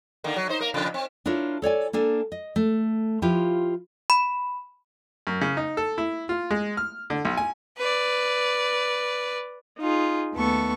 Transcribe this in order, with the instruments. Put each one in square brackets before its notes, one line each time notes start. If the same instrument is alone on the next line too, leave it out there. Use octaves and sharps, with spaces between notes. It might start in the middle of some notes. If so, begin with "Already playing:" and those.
[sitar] D3 D#3 A#3
F#3
D#4 C5
A#3 A#4
F2 A#2 C#3
C4
[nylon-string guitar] D4 E4 F4 A#4 C#5
A4 C#5 D5 G#5
A#3 D4 A4 G#5
D#5
A3
F3 E4 F4 G4 B4
[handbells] B5
[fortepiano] F#2
C#3
D#4
A4
E4
F4
G#3
F6
D3
B1
G#5
[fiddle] B4 D5
[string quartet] D#4 F4 G#4
D#2 A3 B3 A4 C#6